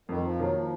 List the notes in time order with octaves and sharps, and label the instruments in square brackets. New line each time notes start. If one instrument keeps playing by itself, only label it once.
[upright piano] F2 [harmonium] D#3
[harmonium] F3
[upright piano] D#3 A#3 [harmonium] F#3
[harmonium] F3